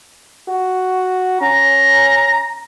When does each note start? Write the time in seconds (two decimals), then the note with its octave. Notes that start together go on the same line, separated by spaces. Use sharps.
0.49 F#4
1.41 C#4 A#5